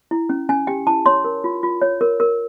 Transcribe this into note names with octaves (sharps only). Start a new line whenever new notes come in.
E4
C#4
C#4 G#5
G4 G5
E4 A5
C#5 C6
A#4
F4
F4
C#5
A#4
A#4